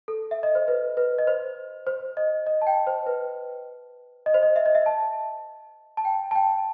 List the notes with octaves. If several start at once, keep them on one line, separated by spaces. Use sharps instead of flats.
A4
E5
D#5
C5
B4
B4
D#5
C5
C5
D#5
D#5
A5
G5
C5
B4
D#5
C5
D#5
E5
D#5
E5
A5
A5
G5
A5
G5